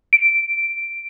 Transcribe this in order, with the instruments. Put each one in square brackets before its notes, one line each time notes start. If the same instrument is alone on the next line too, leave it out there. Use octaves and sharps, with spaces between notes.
[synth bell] D7